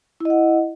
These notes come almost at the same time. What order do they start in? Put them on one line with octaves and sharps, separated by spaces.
E4 D#5 F#5